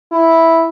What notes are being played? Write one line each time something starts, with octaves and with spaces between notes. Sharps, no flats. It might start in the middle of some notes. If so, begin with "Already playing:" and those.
E4